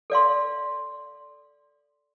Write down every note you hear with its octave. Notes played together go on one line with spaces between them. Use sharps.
A4 D5 F5 C6